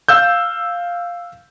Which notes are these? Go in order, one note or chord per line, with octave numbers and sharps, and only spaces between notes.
F5 E6 G6